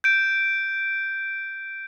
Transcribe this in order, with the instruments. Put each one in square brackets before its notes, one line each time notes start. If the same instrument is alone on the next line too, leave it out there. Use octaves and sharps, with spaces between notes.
[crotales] G6 D7